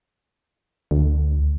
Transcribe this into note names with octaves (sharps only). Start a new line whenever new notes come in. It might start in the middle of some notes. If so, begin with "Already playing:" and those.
D2